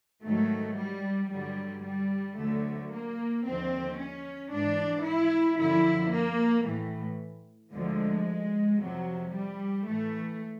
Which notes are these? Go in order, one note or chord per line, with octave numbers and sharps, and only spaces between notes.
G#2 D#3 F#3 A3
G3
G2 D3 F#3 G3
G3
D2 D3 F#3 A3
A#3
D#2 D3 F3 C4
C#4
G#2 E3 D4
E4
F#2 D3 F3 E4
A#3
A2 E3
D2 D3 F3 G#3
F2 C3 F3 F#3
G3
A2 E3 A3